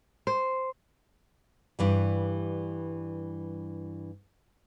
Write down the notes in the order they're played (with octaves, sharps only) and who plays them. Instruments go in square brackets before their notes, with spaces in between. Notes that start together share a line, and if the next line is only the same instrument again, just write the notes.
[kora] C5
[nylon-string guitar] G2 E3 G3